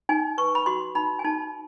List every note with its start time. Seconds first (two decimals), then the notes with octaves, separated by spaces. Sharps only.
0.09 D#4 G#5
0.38 B4 C#6
0.55 B5
0.66 F#4 C6
0.95 D#4 B5
1.19 G#5
1.24 D#4 A5